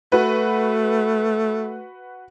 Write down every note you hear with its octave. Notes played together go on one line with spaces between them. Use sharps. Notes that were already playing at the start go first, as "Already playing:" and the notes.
A3 F#4 B4